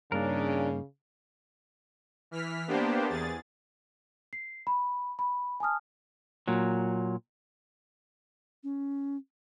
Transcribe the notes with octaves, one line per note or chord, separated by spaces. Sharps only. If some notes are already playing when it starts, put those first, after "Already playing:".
G2 C#3 A#3 D4 D#4 A#4
E3 F6 B6
A#3 B3 D4 G4 C5
E2 G#4 A6
C7
B5
B5
G#5 A5 D#6 F6
A#2 F#3
C#4